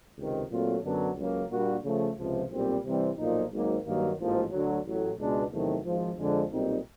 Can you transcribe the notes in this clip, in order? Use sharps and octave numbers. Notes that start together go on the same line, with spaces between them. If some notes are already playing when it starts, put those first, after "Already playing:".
C#2 C3 D#3
A#2 F#3 A3 C4 F4
F#2 D3 F#3 B3 D4
C#2 C#3 F#3 A#3
A#2 G3 A#3 D4 F#4
C#3 F3 A3
C#2 C3 F3
B1 A#2 G3 C4
C3 E3 G3 C4
B1 A#2 F3 A#3 D#4
G#1 G#2 D#3 F#3 A#3
G2 D#3 F#3 A#3
A1 G#2 F3 A#3
D2 D3 F#3
A1 A2 F#3
C#2 B2 G#3 B3 D4
E2 C3 D#3 F#3 A3
G#1 G#2 F3
F2 D3 F3 G#3
B1 A#2 G3 C4 D#4